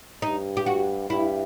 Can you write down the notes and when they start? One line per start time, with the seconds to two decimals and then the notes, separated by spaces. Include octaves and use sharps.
0.22 G2 D#4
0.57 G4
0.66 F#4
1.10 G2 E4